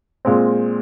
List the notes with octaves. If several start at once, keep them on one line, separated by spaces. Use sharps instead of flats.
A#2 G#3 C4